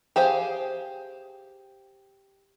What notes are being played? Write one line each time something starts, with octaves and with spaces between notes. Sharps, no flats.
G4 G#4 C5 F5